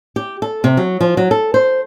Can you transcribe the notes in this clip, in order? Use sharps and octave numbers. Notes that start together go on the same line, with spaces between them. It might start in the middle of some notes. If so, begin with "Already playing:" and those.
G4
A4
C3
F#3
F3
F#3
A4
C5